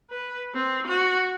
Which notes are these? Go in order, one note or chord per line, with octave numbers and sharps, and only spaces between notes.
B4
C4
F#4